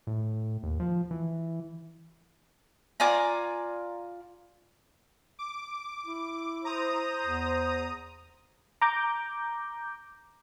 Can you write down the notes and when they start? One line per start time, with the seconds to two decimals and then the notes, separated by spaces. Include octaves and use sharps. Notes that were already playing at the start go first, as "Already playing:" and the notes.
0.07 A2
0.63 D#2
0.80 F3
1.11 E3
3.00 F4 D5 G#5 A#5
5.39 D6
6.06 E4
6.65 C5 A#5 D#6
7.23 E2
8.82 A#5 D6 G6